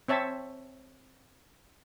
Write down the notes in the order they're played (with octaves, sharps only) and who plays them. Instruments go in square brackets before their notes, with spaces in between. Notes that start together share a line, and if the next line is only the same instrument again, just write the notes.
[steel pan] C4 C#5 E5 A5